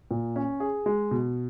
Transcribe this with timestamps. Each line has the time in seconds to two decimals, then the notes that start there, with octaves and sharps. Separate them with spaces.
0.11 A#2
0.36 C#4
0.60 G#4
0.86 G#3
1.11 B2